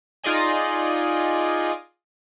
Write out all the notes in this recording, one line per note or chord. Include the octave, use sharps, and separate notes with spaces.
D#4 F4 G#4 D5 D#5 G#5